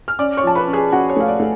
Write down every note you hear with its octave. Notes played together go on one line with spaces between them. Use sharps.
F6
C#4 D5 D6
C#5 C#6
F3 A5
B4 B5
C#4
G#4 G#5
C#4 F#4 F#5
C#5
A3 F5
D5
A3